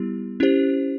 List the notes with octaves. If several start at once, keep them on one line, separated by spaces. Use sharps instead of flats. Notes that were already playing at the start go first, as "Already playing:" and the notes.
Already playing: G3 B3 E4 G4
C#4 E4 G4 C5